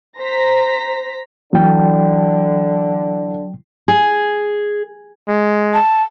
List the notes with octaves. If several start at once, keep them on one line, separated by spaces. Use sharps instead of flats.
C5 A#5 A#6 B6
D3 E3 F#3 G5
G#4
G#3
A5